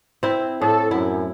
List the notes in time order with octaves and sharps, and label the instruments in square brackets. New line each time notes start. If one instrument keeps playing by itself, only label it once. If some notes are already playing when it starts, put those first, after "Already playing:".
[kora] C4 E4
[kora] A2 [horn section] A4
[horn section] F#2 [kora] E4